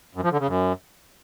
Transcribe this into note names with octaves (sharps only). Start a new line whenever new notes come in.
F#2
F3
D3
C#3
F#2